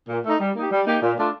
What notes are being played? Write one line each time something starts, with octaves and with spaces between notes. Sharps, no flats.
A#2
A3 D#4
G3
A#3 D#4 G4
G3
A#3 D#4 G4
A#2
A3 D4 F4 A4